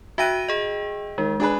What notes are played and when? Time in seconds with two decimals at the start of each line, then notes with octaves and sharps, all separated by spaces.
0.18 F#4 E5 G5 F#6 A#6 D#7
0.48 G#4 D#5
1.18 D#3 G#3
1.40 D4 G#4 B4